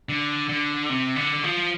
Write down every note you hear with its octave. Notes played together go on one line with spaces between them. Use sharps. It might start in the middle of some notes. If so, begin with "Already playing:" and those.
D3
D3
C3
D3
F3